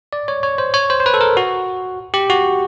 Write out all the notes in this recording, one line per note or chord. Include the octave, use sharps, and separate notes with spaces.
D5
C#5
C#5
C5
C#5
C5
C5
B4
A4
A#4
F#4
G4
F#4